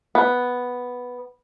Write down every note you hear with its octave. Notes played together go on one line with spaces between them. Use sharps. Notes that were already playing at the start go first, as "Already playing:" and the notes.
B3